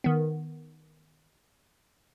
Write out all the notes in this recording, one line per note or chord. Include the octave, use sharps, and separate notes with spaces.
D#3 B3